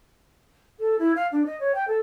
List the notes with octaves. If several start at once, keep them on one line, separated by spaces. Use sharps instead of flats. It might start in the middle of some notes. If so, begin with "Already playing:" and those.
A4
E4
F5
D4
D#5
C#5
G5
A4